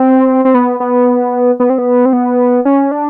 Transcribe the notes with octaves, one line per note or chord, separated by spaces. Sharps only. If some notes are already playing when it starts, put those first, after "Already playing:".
Already playing: C4
C4
B3
B3
B3
C4
B3
C4
B3
C#4
D4